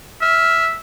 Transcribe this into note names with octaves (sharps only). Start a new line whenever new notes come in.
E5 F6